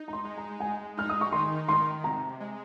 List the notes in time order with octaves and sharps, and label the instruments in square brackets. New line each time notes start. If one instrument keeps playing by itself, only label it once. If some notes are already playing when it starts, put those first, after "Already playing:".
Already playing: [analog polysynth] D#4
[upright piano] A#5
C6
[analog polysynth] G#3
[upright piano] A#5
[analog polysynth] G#3 [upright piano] G#5
[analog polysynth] D#4 [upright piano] F6
[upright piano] D#6
C#6
[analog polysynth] D#3 [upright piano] C6
[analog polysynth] D#3 [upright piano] C6
[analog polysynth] C3 [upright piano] A#5
[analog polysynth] G#3